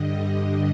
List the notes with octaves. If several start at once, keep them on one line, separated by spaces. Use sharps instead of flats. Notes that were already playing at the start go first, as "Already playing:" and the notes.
Already playing: G2 D3 G3 D#5